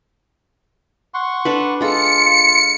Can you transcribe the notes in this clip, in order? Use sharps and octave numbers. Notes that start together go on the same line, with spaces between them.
F#5 C6 C#6
D4 A4 B4
G#3 F4 A4 C#7